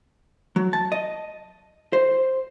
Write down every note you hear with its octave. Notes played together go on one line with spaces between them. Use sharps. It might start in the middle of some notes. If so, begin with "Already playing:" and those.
F#3
A5
D#5
C5